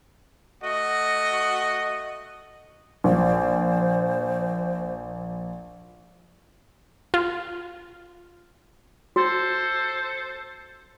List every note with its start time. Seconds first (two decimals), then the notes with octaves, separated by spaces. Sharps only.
0.63 A3 F#4 D#5 F#5
3.04 A#1 C5
7.14 F4
9.16 F#4 A4 C5